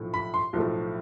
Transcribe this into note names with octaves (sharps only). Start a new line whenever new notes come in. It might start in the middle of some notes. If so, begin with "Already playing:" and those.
Already playing: B1 A2 F3 A3
B5
C6
B1 A2 F3 A3